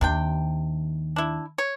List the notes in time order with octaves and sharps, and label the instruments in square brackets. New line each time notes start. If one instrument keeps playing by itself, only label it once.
[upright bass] D#2 D#3 [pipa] C3 D4 G5
[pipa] D4 E4
C#5